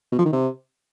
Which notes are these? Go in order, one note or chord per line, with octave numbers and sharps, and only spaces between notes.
B2
F3
D#3
C3